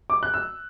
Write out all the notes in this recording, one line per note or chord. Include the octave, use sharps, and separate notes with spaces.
D6
F#6
E6